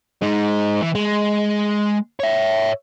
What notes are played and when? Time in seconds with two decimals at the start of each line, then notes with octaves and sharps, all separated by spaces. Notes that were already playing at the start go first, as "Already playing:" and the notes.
0.22 G#3 D#4
0.81 E3
0.95 G#3
2.20 C#5 E5